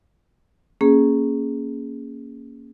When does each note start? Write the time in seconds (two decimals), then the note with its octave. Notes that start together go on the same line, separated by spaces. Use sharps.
0.81 A#3 C#4 G#4